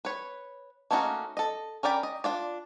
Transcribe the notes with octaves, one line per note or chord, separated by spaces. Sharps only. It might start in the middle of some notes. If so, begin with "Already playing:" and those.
B4 C#5
A3 A#3 C#4 D#4 F#4
A4 D#5
C#4 A#4 D5 G5 B5
D#5
D4 F4 D5